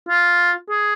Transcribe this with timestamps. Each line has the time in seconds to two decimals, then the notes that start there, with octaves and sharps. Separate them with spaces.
0.09 F4
0.70 G#4